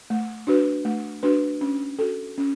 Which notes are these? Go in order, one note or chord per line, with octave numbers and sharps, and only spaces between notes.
A3
D4 F#4 B4
A3
D4 F#4 B4
C#4
F#4 A4
C#4